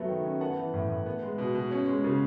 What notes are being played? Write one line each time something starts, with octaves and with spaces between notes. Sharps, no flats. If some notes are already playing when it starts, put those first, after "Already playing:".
Already playing: F#3 A3 B3
D#3
C#4
B3 F#5 A5
E3
A2
A2
B3
G#3
B2
B2
C#4
G#3
C#3